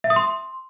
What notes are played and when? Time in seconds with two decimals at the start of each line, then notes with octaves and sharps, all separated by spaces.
0.04 E5
0.10 D#6
0.16 C6